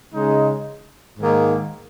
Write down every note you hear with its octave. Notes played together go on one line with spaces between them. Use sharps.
C#3 G#3 D#4
G#2 D#3 A#3